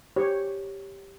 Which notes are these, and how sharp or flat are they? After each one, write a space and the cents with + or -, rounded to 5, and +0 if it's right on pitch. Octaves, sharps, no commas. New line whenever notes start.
G4 +0 C#5 +0